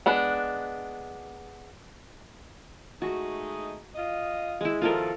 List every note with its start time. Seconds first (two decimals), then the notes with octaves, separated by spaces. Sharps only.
0.06 G#3 B3 D4
3.02 G#3 A3 D#4 F#4
3.95 F4 D#5
4.61 G#3 E4
4.82 B2 D#3 F3 F4 A4 A#4